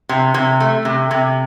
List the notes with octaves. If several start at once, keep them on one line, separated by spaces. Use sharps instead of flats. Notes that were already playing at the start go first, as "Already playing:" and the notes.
C3
C3
A3
C3
C3